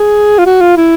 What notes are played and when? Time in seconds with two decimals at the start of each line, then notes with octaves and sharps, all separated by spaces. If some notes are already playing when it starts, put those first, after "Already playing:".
Already playing: G#4
0.39 F4
0.46 F#4
0.61 F4
0.77 E4